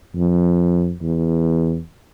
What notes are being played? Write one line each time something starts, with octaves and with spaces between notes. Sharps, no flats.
F2
E2